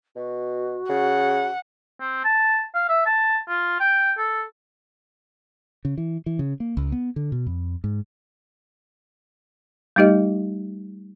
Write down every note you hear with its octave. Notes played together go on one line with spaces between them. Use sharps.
B2 F#4
C#3 F#5
C4
A5
F5
E5
A5
F4
G5
A4
C#3
E3
E3
C#3
A#3
C#2
B3
D3
B2
F2
G#2
G3 A3 D#4 G4 D#5